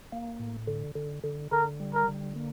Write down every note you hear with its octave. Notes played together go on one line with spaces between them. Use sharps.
A#3
A2
D3
D3
D3
D3 A#4
G3
A#4
D3
A#3